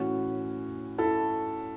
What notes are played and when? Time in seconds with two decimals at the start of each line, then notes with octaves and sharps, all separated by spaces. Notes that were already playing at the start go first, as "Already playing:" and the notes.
Already playing: A2 E3 C#4 F#4
0.98 E4 A4